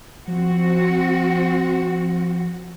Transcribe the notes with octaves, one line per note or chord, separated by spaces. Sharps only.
F3 C4 F#4